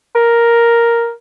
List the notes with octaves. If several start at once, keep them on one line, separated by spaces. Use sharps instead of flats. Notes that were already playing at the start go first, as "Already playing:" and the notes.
A#4